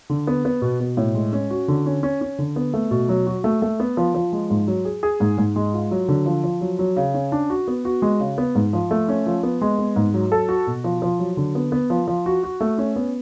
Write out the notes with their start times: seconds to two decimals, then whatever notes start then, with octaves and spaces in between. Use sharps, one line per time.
0.10 D3
0.27 B3
0.45 B3
0.62 B2
0.80 B2
0.97 A2
1.15 G#3
1.33 C#4
1.51 F#4
1.68 D3
1.86 C#4
2.03 C#4
2.21 C#4
2.39 D3
2.56 B3
2.74 A3
2.91 B2
3.09 F#3
3.27 F#4
3.44 A3
3.62 A3
3.80 B3
3.97 F3
4.15 F3
4.33 G#3
4.50 G#2
4.67 F#3
4.85 G#4
5.03 G#4
5.20 G#2
5.38 G#2
5.56 G#3
5.73 F4
5.91 F#3
6.08 D3
6.26 F3
6.44 F3
6.61 F#3
6.79 F#3
6.97 C#3
7.14 C#4
7.32 D4
7.50 F#4
7.68 B3
7.85 F#4
8.02 G#3
8.20 C#3
8.38 B3
8.55 G#2
8.73 F3
8.91 A3
9.08 C#4
9.26 F3
9.43 B3
9.62 G#3
9.79 B3
9.96 G#2
10.14 F#3
10.32 A4
10.49 F#4
10.67 B2
10.84 F3
11.02 F3
11.19 F#3
11.37 D3
11.55 B3
11.72 B3
11.90 F3
12.08 F3
12.26 F#4
12.43 F#4
12.61 A3
12.78 C#4
12.96 B3